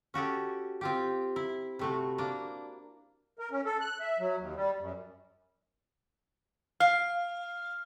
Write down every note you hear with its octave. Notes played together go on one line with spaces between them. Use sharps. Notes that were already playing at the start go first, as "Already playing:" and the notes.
C#4 F#4 G4 A4
C4 F4 G4
E4
C3 A3 F#4
A#3 D4
A#4
C#4
A4
F#6
E5
F#3
D#2
G3
F#2
F5 F6